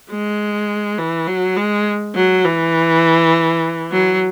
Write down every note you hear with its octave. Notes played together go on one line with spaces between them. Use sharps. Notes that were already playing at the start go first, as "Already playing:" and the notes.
G#3
E3
F#3
G#3
F#3
E3
F#3